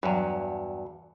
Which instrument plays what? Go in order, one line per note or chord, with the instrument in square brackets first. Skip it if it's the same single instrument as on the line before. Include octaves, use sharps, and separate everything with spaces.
[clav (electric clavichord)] E2 G2 [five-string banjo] F#3